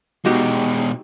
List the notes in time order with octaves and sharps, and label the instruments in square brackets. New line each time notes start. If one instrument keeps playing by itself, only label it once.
[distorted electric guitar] B2 G#3 [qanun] D#4 F#4 G4